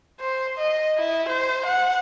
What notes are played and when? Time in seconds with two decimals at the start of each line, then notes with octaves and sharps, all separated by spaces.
0.20 C5
0.58 D#5
0.97 E4
1.29 C5
1.66 F#5